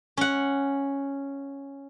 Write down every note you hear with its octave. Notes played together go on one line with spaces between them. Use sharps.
C#4 F#5